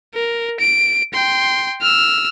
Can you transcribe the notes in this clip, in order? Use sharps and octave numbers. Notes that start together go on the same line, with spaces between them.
A#4
D7
G5 C6
E6 F6